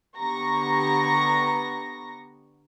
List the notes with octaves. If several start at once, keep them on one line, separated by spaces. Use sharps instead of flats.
D3 B3 G4 A#5 C#6 A#6